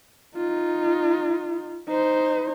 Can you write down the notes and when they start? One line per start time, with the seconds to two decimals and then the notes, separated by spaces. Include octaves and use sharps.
0.37 D#4 F4
1.88 D#4 C5